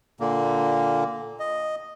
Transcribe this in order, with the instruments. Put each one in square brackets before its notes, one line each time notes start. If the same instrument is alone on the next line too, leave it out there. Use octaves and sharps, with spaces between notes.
[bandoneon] A#2 D3 A#3
D#5